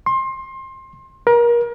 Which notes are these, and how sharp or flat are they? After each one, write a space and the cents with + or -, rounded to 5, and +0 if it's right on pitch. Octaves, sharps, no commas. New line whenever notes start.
C6 +25
A#4 +30